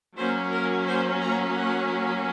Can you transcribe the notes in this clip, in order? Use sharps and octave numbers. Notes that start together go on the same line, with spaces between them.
F#3 A#3 C#4 C5
A#4
C5
A#5
F#5